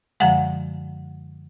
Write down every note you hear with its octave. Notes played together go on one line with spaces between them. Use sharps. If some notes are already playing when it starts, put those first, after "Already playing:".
F#2 D3 F3 G#3 F#5